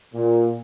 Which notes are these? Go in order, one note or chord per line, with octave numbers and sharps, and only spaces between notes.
A#2